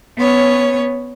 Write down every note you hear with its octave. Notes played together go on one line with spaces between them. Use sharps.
B3 C#4 C#5